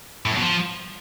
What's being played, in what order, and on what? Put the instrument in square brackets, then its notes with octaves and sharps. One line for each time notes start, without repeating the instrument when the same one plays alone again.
[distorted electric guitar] A2
F#2
B2
F3